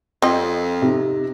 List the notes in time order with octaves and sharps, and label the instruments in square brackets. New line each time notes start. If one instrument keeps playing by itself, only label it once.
[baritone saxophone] F2 [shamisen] C4 D#5
[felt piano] C3 D#4